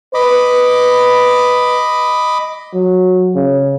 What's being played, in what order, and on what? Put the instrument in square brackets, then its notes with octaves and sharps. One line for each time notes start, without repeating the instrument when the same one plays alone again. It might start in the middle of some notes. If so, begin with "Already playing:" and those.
[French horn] B4 [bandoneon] D#5 B5 D6
[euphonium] F#3
C#3